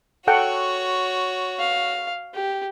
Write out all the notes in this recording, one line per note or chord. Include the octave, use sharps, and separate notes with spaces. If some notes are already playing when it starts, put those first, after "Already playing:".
F#4 A4 C#5 F#5 G5
F5
G4